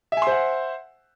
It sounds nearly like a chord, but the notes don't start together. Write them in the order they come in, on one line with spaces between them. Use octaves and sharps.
E5 G#5 C6 C5 F#5